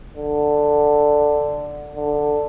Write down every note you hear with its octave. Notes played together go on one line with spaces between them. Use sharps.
D3
D3